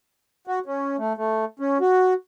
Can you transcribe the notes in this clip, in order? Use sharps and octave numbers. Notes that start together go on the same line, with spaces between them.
F#4
C#4
A3
A3
C#4
F#4